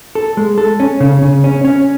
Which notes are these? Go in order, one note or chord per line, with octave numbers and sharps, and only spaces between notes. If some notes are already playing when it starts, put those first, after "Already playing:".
A4
G#3
A4
C#4
C#3
C#3
C#4
C#4